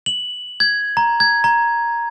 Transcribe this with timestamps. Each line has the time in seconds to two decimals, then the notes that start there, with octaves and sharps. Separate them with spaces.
0.06 F#7
0.60 G#6
0.97 A#5
1.20 G#6
1.44 A#5